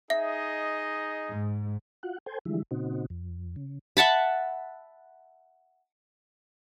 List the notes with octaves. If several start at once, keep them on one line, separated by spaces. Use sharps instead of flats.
D#4 G#4 D#5 E5
G#2
F4 F#4 F#5
A4 C5 G5 G#5
D3 E3 F3 G3 G#3 E4
A#2 C#3 C4 D#4 F#4
F2
C#3
E5 F#5 A5 B5